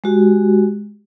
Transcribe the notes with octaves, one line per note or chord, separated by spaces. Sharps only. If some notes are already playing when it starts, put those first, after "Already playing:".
G#3 F#4 G4